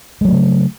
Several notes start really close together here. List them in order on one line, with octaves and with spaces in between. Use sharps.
G#3 F#3 A3 C#3